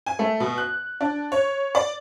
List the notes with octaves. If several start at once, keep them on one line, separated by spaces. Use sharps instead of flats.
G#5
A3
B2
F#6
D4
C#5
D5